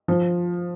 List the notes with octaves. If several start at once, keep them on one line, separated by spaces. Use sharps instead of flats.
F3